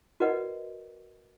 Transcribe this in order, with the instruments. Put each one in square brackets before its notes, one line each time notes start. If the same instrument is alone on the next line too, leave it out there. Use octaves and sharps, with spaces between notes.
[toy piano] F#4 A#4 B4 D5 D#5 F#5